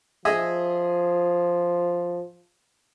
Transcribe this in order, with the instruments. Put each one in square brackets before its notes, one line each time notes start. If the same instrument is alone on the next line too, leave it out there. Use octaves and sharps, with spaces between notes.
[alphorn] F3 [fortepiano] G#4 D#5 E5